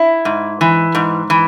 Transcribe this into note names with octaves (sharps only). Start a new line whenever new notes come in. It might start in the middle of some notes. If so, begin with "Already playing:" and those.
Already playing: E4
G#2
E3
G#2
E3